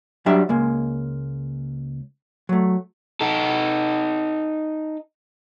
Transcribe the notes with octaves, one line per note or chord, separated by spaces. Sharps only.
F#3 G3 D4 G4 E5
C#2 G#3 A#3
F#3 A3
D#4 A4